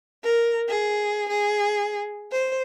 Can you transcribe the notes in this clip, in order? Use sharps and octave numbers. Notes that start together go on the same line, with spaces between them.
A#4
G#4
G#4
C5